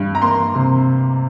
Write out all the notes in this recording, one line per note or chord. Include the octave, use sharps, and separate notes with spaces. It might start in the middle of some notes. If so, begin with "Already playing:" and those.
Already playing: G2
A#5
A#3 C6
C3